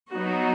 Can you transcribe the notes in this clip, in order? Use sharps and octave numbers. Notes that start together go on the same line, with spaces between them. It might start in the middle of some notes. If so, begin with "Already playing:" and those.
F#3 B3 D#4 F#4